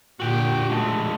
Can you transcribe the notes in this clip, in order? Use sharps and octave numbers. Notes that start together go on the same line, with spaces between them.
A#2 D3 F#4 G4 G5
G#3 A3 D4